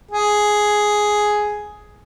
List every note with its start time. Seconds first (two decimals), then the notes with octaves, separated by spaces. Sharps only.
0.11 G#4